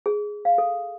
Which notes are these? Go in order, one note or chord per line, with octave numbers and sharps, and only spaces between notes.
G#4
F5
A4